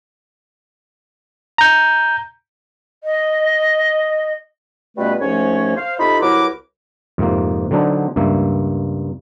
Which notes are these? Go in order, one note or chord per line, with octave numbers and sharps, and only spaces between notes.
A#5 G6
D#5
B2 G3 A3 C#4 F4 B4
C2 G#2 F3 A3 C#4 C#5
C5 F5
C3 D#4 F4 A4 B5
C2 F#3 E4 A#4 B4 D6
F2 G#2 C3 A#3
D3 F#3 C4 D4 D#4
C#2 G2 A#3 E5